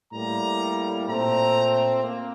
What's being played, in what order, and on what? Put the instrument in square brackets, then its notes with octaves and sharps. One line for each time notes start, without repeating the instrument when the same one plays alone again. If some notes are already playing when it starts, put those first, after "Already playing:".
[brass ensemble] A2 G3 A#3 A#5
A#2 A3 C4 A#5
A#3